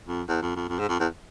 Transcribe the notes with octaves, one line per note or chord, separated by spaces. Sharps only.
F2
E2
F2
F2
F2
G#2
F2
E2